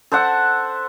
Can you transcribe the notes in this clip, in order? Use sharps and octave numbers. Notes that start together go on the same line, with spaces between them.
A4 C5 E5 F#5